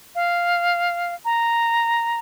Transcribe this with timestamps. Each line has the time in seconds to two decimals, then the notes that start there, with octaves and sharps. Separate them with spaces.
0.15 F5
1.25 A#5